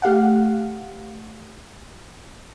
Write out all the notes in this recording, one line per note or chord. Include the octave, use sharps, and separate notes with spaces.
A3 G4 F5 F#5